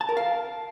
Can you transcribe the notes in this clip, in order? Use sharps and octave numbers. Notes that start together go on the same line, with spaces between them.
A5
A#4
F5